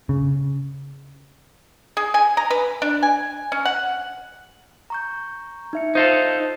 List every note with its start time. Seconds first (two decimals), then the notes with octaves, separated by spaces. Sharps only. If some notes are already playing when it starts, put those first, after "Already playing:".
0.09 C#3
1.97 G#4
2.14 G#5
2.37 A#5
2.50 B4
2.82 D4
3.03 G#5
3.52 C#4
3.65 F#5
4.90 A#5 C#6 G6
5.73 D#4 E5 C#7
5.95 D#4 F4 A4 C5